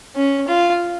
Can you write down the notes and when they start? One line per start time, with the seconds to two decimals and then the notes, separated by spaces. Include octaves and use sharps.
0.16 C#4
0.48 F4